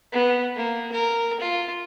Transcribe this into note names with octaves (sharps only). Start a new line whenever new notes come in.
B3
A#3
A#4
F4